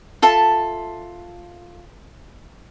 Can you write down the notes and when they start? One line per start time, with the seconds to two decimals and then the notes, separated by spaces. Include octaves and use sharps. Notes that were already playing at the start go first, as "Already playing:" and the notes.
0.22 F4 A4 E5 A5